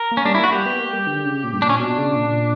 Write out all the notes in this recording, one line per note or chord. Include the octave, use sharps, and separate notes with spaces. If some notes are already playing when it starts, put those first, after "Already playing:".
Already playing: A#4
A#3
C#4
G3 D4
E4
A#3 F#4
G3 G4
B3
A#3
G3
D3
C#3
A#2
G2
A#2 D4
C#4
B2 D4
C#3
A#2